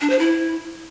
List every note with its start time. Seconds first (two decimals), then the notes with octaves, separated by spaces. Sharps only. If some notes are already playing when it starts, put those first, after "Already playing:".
0.01 D4
0.10 C5
0.19 E4